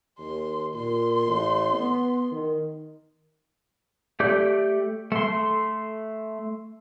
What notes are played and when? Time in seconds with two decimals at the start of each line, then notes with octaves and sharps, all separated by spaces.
0.19 D#2 C6
0.74 A#2 C6
1.26 A1
1.73 B3
2.32 D#3
4.20 A3 G4 D5 D6 G6
5.12 A3 C6